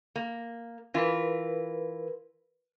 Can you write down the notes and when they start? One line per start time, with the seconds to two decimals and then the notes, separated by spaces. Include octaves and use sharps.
0.16 A#3
0.94 E3 F4 A#4 B4